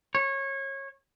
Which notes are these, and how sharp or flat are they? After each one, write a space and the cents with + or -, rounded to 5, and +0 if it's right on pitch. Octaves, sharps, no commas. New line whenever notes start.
C#5 -25